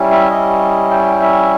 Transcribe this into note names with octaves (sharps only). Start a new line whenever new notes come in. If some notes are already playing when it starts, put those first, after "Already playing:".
Already playing: G3 C#4 E4
E5
D#5
G5
E5